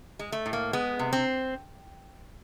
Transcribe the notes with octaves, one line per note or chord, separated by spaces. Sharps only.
G#3
A3
A2
A#3
G#3 B3
C3
C4